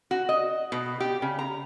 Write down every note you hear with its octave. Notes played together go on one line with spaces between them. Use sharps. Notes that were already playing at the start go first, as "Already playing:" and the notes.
F#4
D#5
B2
G4
C#3
A#5